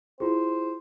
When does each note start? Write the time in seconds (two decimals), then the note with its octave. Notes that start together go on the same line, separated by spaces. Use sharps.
0.20 E4 F4 G#4 C5